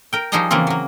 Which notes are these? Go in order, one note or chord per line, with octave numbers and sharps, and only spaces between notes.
A#4 G5
F3 G3 D#4 G#4 D#5 A#5
C#3 E3 A#3 C4 F4
F#3 A#3